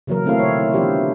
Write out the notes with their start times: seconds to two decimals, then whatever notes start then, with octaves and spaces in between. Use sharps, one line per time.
0.07 C#3 E3 F#3 A#3 A#4
0.25 D#3 A3 C4 E4 A4 F5
0.39 B2 D3 C#5
0.60 E4
0.73 E3 B3 D4 F4 G4 C5